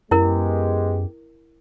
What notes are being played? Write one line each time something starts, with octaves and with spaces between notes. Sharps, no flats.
F#2 G#3 B3 E4 G4 A#4